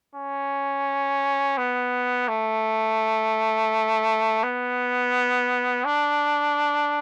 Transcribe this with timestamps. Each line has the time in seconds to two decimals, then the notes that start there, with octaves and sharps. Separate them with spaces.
0.15 C#4
1.58 B3
2.28 A3
4.43 B3
5.85 D4